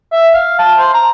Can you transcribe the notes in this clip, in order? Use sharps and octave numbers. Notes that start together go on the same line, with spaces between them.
E5
F5
A5
C5
A#5